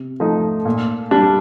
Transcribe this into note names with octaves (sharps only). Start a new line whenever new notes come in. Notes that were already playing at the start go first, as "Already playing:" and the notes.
Already playing: C3
F3 A3 D#4
A#2
G3 D4